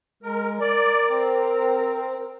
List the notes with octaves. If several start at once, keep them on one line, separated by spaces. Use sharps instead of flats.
G#3 A#4
A#4 D5
C4